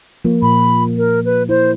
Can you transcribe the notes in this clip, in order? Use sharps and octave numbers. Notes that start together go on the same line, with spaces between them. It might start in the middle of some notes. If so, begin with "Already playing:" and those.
F3 A#3
A#2 B5
A#4
B4
E4 C5